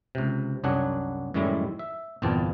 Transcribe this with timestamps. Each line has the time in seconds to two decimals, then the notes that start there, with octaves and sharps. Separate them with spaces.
0.15 C#2 C3
0.64 C2 F#2 F#3 D4 G#4 F#5
1.34 F#2 A2 D#3 G3 G#3 E4
1.79 E5
2.22 G1 E2 A#2 C4 F4 A5